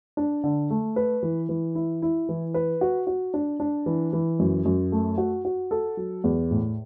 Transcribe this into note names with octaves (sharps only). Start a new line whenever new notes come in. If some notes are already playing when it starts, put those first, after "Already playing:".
D4
D3
A3
B4
E3
E3
E4
E4
E3
B4
F#4
F#4
D4
D4
E3
E3
F#2
F#2
A3
F#4
F#4
A4
F#3
E2
A2